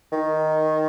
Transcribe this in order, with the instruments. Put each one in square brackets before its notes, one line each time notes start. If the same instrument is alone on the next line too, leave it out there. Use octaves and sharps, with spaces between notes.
[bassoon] D#3